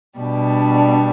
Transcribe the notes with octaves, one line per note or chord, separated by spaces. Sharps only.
B2 G3 D4